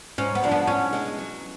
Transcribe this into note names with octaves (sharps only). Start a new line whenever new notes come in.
G#2 C#4
B3
F3 G#3 D4
B3
A2 C#4
G#3 B3
F#3